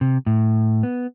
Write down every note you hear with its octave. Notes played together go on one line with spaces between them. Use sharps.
C3
A2
B3